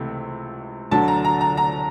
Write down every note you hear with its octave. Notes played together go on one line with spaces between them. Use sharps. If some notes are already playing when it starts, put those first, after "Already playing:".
Already playing: C#2 C3 E3 A3 C4
D2 D3 F#3 A5
A#5
A#5
A#5
A#5